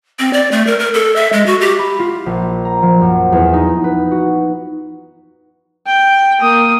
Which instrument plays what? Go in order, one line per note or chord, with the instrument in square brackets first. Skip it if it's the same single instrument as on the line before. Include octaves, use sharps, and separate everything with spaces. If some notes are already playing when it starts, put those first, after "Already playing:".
[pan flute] C4
D5
A3
A#4
A#4
A4
E5
G#3
F#4
G4
[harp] B5
F4
A#1
A#5
F3
F#2
E2
D#4
B4
F#4
[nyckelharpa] G5
A#3 D#6